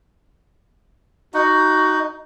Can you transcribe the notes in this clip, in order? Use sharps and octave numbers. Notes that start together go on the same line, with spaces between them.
D#4 F#4